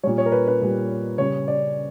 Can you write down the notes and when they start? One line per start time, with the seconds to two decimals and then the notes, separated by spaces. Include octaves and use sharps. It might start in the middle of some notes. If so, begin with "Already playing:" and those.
0.03 A#2 G3 C#5
0.18 C#5
0.26 A#4
0.32 B4
0.48 B4
0.62 A#2 G3
1.18 C#3 G3 C#5
1.48 D5